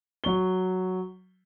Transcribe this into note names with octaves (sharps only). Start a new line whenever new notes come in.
F#3 C#6 G7